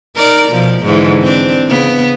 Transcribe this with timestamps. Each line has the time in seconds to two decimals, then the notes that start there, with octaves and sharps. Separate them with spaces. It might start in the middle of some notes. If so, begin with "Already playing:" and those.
0.16 D#4 A#4 D5
0.49 B2 F3
0.83 G#2 D3 E3
1.22 C4 D4
1.67 C#3 B3